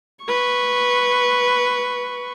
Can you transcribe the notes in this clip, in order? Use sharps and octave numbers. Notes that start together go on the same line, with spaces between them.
B4 C#6